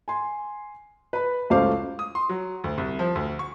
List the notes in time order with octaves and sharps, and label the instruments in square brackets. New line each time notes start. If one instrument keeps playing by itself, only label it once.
[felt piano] G#5 C6
B4 B5
C#2 F#2 A3 C5 F5 D6
[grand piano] D#6
C6
F#3
D2
C2
F3
D2
C#6